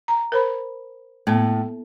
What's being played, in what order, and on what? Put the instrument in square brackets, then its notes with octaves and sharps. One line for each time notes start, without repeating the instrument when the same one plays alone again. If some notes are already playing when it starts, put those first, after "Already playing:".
[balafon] A#5
A#4 C5 B5
[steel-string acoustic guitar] A2 [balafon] A#3 B3 A4